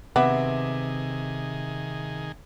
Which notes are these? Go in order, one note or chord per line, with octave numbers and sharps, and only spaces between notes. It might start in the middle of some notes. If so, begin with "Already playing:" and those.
C3 D#3 B3 G#4 E5 D6